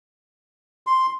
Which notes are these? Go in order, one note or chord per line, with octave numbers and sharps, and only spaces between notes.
C6